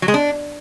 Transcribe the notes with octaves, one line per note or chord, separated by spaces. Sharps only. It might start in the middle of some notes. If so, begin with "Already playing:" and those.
F#3
G#3
D4